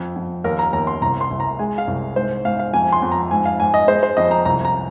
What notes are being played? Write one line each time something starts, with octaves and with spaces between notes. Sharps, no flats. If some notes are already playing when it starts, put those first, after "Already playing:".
Already playing: F2
F2
D#2 A#4
A#5
D#2 A#5
C6
C2 A#5
C6
C2
A#5
G#3 G#5
F5
C2
G#2 C5
G#2 F5
F5
F2 G#5
C6
F2
A#5
G#2 G#5
F5
G#2 G#5
D#5
G#3 C5
C5
F2 D#5
A#5
C2 A#5
A#5